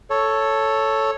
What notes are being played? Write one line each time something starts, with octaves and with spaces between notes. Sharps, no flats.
A4 C#5